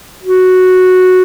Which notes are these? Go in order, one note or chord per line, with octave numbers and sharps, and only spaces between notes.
F#4